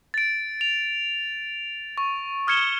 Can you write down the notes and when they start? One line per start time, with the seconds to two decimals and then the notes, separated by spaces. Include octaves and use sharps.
0.14 A6 D7
0.61 F7
1.98 C#6
2.47 D#6 F6 G#6 C#7 E7 G7